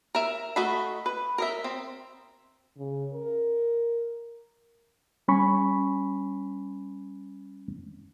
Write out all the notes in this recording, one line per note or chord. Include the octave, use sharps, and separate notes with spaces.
A#4 E5
A3 F#4 D#5 E5 B5
B4
A#4 D#5 E5
C4
C#3
A#4
G3 C#4 G#5 B5 C#6